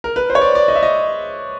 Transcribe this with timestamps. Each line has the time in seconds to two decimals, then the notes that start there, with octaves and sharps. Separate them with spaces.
0.04 A#4
0.16 B4
0.30 C5
0.35 C#5
0.41 D5
0.55 D5
0.68 D#5
0.75 E5
0.83 D#5